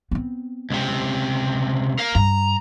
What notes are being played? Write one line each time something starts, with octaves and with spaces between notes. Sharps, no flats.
B3 C4
C#2 C3
A#4 F5
G2 A#5